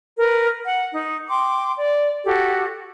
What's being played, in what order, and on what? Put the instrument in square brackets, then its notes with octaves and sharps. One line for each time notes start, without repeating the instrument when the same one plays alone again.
[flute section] A#4 B4
F#5
D#4
G5 C6 D6
D5
F#4 G4 A4